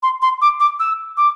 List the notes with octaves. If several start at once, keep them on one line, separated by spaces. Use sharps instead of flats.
C6
C6
D6
D6
E6
D6